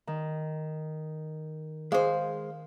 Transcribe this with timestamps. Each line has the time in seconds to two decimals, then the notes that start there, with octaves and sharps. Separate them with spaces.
0.07 D#3
1.92 G#3 G#4 A4 C5 F5